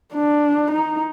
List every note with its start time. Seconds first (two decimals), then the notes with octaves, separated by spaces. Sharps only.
0.14 D4
0.71 D#4